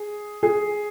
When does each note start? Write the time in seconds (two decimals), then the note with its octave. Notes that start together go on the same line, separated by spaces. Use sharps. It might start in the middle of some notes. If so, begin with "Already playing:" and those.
Already playing: G#4
0.43 G#4